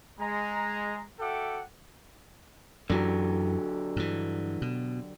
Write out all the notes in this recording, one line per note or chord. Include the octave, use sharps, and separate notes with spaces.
G#3 A#5
F#4 A4 E5 F#5 G5 D6
F#2 D3 E3 F#3 G4
G2 E3
B2